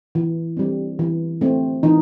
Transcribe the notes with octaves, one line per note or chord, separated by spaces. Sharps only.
E3
G3 C4
E3
A3 C4
E3 D#4